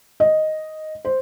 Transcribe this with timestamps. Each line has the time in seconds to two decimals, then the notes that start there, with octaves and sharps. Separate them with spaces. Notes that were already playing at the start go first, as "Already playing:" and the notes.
0.20 D#5
1.05 C5